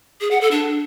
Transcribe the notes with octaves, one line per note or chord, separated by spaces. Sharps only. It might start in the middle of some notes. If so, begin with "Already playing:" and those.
G#4
F#5
A4
D4